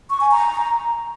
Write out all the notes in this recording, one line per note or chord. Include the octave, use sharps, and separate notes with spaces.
C#6
G#5
A#5